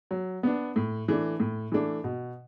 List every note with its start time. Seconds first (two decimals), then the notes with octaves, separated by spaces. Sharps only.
0.11 F#3
0.43 B3 D4
0.76 A2
1.08 E3 A3 D4
1.40 A2
1.72 E3 A3 D4
2.04 B2